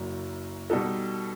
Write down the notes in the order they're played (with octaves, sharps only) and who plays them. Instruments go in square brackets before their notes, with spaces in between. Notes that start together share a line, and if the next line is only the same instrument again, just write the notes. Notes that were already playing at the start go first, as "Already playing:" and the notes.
Already playing: [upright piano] F#1 F#2 F#3
B2 G3 D#4 F#4 A4